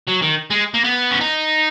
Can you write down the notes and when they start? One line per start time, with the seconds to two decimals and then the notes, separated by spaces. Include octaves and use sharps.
0.08 F#3
0.22 D#3
0.50 G#3
0.74 A#3
0.84 B3
1.11 C#4
1.20 D#4